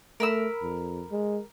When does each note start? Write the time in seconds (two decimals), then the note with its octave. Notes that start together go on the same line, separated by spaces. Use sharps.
0.20 A3 A#4 B5 E6
0.63 F2
1.11 G#3